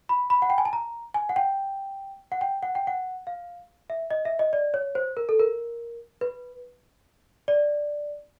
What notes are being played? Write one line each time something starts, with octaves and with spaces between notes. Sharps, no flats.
B5
B5
F#5
G5
G#5
A5
A#5
G#5
F#5
G5
F#5
G5
F#5
G5
F#5
F5
E5
D#5
E5
D#5
D5
C#5
C5
A#4
A4
A#4
B4
D5